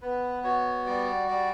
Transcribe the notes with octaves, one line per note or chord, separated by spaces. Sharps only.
B3 B4
F#4 C#5
G3 D5
G3 D5